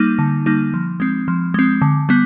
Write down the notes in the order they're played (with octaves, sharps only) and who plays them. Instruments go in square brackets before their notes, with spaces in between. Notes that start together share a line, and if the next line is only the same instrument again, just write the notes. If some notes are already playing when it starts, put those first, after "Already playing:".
Already playing: [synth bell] G3 A#3 D#4
D3
G3 A#3 D#4
F3
G#3 C4
F3
G#3 C4
D3
G3 B3